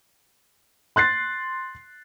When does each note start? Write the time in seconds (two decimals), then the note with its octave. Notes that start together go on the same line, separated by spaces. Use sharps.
0.96 C6 F#6 A6 C7